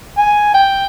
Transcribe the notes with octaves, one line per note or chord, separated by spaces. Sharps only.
G#5
G5